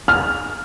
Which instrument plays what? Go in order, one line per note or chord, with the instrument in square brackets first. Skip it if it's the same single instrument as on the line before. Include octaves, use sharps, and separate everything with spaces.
[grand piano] F6